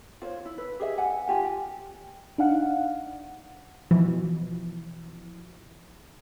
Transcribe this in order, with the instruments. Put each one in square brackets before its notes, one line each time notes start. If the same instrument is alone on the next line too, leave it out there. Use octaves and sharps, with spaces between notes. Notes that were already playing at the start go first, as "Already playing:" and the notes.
[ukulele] F4 C5 C#5
E4
B4
G4 G#4 D#5 E5
F#5 G#5
F4 G4 G#5
[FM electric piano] D4 D#4 F5 F#5
[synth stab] B2 E3 F3